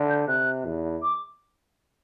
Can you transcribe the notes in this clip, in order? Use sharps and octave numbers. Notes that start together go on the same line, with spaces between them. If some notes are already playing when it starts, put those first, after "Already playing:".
Already playing: D3
G6
C3 F#6
E2
D6